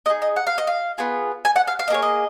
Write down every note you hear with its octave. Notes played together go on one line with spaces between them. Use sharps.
B3 D#5
D#4 G#4
D#5
F#5
F5
D#5
F5
B3 F4 G#4
G#5
F#5
F5
F5
D#5
A#3 C#4 G#4 C#5
D#5